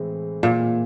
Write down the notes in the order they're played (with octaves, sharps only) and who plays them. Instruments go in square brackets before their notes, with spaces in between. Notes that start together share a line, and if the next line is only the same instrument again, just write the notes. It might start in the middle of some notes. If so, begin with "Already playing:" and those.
Already playing: [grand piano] A2 E3 G#3 C4
[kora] A#2